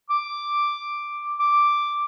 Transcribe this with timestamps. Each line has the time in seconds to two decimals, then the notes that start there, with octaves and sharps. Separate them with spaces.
0.10 D6
1.39 D6